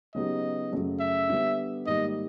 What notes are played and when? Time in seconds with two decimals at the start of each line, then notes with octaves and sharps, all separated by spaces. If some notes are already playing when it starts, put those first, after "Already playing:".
0.14 C#3 F#3 B3 D#4 G4 D#5
0.71 F#2 C#3 F#3 A3
1.00 E5
1.29 D3 G3 B3
1.86 G#2 D#3 G3 A#3 D#5